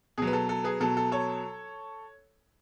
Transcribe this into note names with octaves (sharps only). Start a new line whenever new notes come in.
B2 F#3 G#4
B4
A4
A4
G#4 B4
B2 F#3 A4
A4
A4 C#5